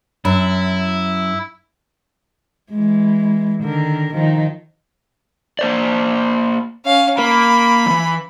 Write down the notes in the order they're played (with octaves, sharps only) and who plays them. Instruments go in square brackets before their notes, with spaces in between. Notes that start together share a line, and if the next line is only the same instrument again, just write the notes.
[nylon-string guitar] F#2 [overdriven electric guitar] E4
[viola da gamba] E3 G#3
D3 D#3 A#4
D#3 F3 D#4
[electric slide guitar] A#3 C5 D5
[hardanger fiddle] C#4 F5
[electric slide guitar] A#3 A#4 [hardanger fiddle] B5
[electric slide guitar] E3 F3